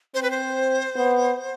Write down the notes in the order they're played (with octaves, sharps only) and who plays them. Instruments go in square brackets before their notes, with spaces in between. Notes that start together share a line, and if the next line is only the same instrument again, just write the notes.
[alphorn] C4 [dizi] C5
[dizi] B4
C5
[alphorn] B3